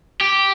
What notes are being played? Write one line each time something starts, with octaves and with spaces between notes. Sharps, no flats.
G4